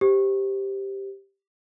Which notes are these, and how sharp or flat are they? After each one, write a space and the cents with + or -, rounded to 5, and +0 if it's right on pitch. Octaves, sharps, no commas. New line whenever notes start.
G4 +0 C5 +0